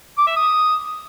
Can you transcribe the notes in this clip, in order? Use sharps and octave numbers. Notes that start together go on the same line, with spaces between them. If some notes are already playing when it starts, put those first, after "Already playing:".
D6
E5
D#6